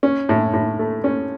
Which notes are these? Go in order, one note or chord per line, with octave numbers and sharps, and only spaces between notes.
C#4
A2
A2
A3
C#4